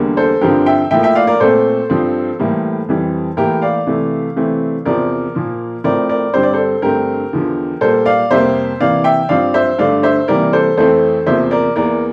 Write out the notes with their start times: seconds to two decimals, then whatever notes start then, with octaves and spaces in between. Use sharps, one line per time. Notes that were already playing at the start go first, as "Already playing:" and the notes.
Already playing: E2 D3 G3 A#3
0.17 A4 C5
0.41 G2 D3 F3 C4 G4 A#4
0.66 E5 G5
0.91 A2 F3 A#3 E5 G5
1.03 E5 G5
1.15 D5 F5
1.27 A#4 D5
1.40 A#2 A3 C4 A4 C5
1.90 G2 F3 C4
2.39 A2 E3 G3 A#3
2.89 F2 E3 G3
3.37 A2 E3 A#3 G4 A#4
3.62 D5 F5
3.87 C3 E3 A3
4.36 C3 E3 A3 C4
4.85 E2 C3 F3 C4 A#4 D5
5.35 A#2 F3 A#3
5.84 A2 F3 C4 A#4 D5
6.09 A#4 D5
6.33 G2 D3 G3 C4 C5
6.43 D5
6.53 A4 C5
6.82 G2 D3 A3 C4 G4 A#4
7.33 E2 D3 F3
7.81 A#2 G3 A#3 A4 C5
8.06 D5 F5
8.30 F2 C3 G3 A#3 C5 E5
8.81 C3 E3 A#3 D5 F5
9.04 E5 G5
9.29 G2 F3 C4 D5 F5
9.54 C5 E5
9.78 G2 D3 A3 D5 F5
10.03 C5 E5
10.28 C3 E3 G3 A#3 A#4 D5
10.53 A4 C5
10.77 F2 E3 A3 C4 A4 C5
11.26 E2 C3 F3 A#3 C5 E5
11.51 A#4 D5
11.76 E2 E3 A#3 A#4 D5